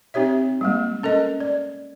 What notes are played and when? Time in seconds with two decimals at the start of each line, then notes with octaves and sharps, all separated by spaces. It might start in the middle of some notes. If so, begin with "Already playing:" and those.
0.14 C4 D#4 G4 C#5 E5
0.61 G3 G#3 A#3
1.03 C#4 A4 A#4 D#5
1.40 D5